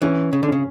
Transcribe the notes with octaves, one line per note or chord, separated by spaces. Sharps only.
E3 C#4
C#3
D3
C#3 C#4